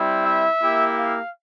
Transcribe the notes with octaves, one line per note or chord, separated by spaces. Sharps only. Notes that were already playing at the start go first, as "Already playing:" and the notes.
Already playing: G3 C4 E4
E5
A#3 E4 G4
F5